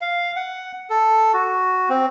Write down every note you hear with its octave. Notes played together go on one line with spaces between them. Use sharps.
F5
F#5
A4
F#4
C4